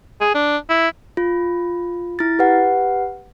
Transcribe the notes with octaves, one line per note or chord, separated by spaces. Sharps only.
G#4
D4
E4
F4
E4 A6
G4 B4 F#5